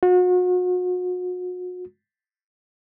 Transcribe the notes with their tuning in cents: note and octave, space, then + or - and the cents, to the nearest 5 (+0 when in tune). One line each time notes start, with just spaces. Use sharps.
F#4 -35